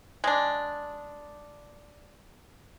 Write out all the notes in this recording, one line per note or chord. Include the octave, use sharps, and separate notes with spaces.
G#3 D4